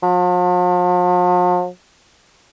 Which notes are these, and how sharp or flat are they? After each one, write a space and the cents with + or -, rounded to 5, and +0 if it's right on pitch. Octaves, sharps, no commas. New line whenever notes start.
F3 +45